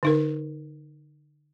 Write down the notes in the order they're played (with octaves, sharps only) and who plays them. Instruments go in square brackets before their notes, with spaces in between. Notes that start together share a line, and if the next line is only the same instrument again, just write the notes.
[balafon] D3 D#4 A#4